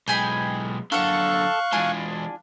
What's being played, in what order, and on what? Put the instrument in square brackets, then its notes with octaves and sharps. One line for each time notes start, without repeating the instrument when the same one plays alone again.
[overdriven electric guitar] B1 G#3 [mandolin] G5 G#5 B5
[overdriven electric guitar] F#2 D3 [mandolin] A4 F#5 [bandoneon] F5 C#6 F#6
[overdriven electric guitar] E3 G#3 [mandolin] D4 F4 G#5